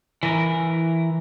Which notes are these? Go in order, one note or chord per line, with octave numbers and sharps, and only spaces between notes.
E3 A#4